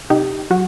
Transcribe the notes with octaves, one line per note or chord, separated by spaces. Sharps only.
C3 D#4 G4
F#3 F#4